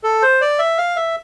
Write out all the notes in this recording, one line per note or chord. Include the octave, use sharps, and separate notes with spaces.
A4
C5
D5
E5
F5
E5